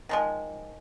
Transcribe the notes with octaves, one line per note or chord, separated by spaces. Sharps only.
D#3 F3 G#3